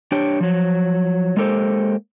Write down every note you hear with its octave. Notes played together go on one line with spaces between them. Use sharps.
D4 G4 C#5 G5
F3 F#3
G#3 A#3 G4 A4 C5